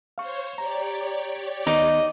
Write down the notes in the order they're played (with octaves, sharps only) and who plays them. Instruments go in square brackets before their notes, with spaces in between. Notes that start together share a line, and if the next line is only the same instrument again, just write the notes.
[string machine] C5 C#5 [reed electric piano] F5 C#6
[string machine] G4 C#5 D5 [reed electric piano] A#5
[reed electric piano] D#3 B3 [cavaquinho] D#4 D6 [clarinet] D#5